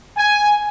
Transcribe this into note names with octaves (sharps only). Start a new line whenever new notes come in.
G#5